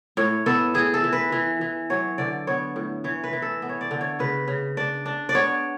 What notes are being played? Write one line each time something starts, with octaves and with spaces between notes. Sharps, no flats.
A2 C#5
B3 A4
E3 G#4
A4
E3
B4
E3
E3
F#3 C#5
D3 D5
B3 C#5
A2
E3 C#5
B4
E3
A4
B3
C#5
D5
D3
C#5
C#3 B4
C#3
D4 D5
D4
D5
B3 C#5